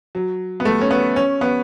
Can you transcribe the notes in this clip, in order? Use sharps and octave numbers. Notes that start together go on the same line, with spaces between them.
F#3
B3
A3
C#4
B3
C#4
B3